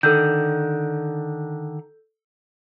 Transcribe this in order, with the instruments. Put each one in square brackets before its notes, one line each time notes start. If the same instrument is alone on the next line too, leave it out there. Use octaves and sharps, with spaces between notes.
[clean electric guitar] D3 D#3 [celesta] A4 E6 G6